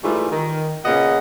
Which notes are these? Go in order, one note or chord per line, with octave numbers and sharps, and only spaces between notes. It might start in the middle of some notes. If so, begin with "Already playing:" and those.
G#2 E3 G3 A3 F4
D#3
A#2 C#3 B3 D#5 F#5